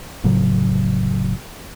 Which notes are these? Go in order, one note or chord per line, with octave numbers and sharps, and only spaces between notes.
F1 A2 C#3 F#3